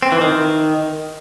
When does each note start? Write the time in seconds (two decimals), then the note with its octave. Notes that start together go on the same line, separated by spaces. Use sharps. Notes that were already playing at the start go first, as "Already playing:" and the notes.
0.03 C4
0.12 E3
0.21 D#3